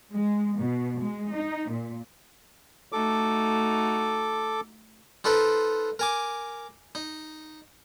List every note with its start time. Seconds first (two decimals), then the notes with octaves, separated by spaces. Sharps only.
0.14 G#3
0.58 B2
1.01 G#3
1.34 D#4
1.71 A#2
2.92 A3 D#4 F#4 A4 D6
5.24 D#4 F4 A4 B4 C5
5.99 A#4 G#5 D6
6.95 D#4